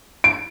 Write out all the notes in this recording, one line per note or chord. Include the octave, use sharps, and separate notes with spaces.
D7